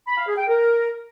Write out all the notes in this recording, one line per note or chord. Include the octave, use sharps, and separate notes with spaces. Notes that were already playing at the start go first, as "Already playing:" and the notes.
B5
F5
G#4
G5
A#4